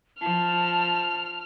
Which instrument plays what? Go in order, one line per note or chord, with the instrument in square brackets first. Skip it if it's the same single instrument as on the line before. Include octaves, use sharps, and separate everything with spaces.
[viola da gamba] F3 [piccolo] A5 [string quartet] F6